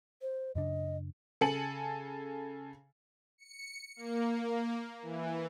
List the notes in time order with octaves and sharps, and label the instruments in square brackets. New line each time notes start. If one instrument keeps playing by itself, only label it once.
[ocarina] C5
[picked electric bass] F#2 C#3 D4 [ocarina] D#5
[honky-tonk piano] C#3 A4 G#5 C#7 F#7
[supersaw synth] C#7
A#3
E3